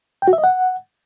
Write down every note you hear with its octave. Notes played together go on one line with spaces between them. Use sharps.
G5
F#4
E5
D#5
F#5